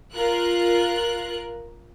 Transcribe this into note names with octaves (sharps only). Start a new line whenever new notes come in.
F4 A#4 F#6